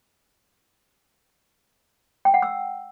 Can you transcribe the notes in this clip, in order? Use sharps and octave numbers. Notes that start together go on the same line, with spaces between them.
G5
F#5
E6